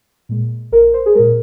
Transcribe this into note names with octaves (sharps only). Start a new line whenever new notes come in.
A#2 G#3
A#1 A#4
C5
G#4
A#2 G#3 A#4